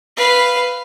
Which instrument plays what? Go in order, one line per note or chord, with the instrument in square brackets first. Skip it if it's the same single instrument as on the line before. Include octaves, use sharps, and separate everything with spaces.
[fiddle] B4 F5